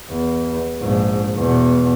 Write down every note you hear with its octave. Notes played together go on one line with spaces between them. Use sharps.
E2
A#1 G#2
E2 B2